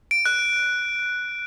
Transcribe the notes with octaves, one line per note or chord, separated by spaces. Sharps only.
D7
F#6